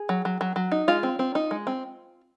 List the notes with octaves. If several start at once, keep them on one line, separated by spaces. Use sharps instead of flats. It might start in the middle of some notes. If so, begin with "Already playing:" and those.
Already playing: G#4
F#3
F#3
F#3
F#3
D#4
G#3 F4
C4
C4
D#4
G#3
C4